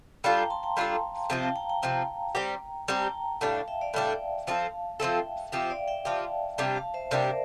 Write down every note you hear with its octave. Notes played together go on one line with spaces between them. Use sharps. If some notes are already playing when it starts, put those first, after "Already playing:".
G3 D4 F4 A4 F5 A5
G5 A#5
A5 C6
G5 A#5
G3 D4 F4 A4 F5 A5
C3 F3 C4 F5 A5
G5
F5 A5
G5 A#5
G5 A#5
C3 F3 C4
G3 C4 G4
G3 C4 G4 A#5
A5
G5 A#5
A2 G3 D4 F5 A5
F5 A5
E5 G5
D5 F5
A2 G3 D4 E5 G5
F3 C4 F4 A4 F5 A5
F3 C4 F4 A4 E5 G5
F3 C4 G4 E5 G5
D5 F5
E5 G5
F3 C4 G4 F5 A5
C3 G3 D4 G4
F5 A5
C5 E5
C3 G3 D4 G4 A#4 D5
C5 E5